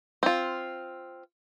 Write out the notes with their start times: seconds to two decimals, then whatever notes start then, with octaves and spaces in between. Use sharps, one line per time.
0.23 C4 F4